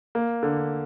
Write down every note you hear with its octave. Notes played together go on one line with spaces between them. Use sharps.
A#3
D3